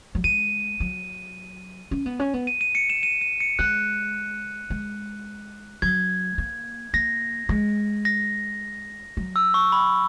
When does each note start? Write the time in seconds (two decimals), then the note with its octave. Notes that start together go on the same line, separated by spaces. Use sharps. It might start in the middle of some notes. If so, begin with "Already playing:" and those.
0.15 F#3
0.24 G#3 D#7
0.80 F#3
1.91 C#4
2.06 B3
2.20 C#4
2.33 B3
2.47 D#7
2.61 D#7
2.75 C#7
2.90 E7
3.03 D#7
3.21 D#7
3.40 C#7
3.59 G#3 F#6
4.70 G#3
5.82 F#3 G#6
6.38 A#3
6.94 A#3 A#6
7.49 G#3
8.05 A#6
9.17 F#3
9.36 E6
9.54 C#6
9.72 B5